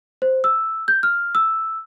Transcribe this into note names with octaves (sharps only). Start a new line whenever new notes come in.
C5
E6
G6
F6
E6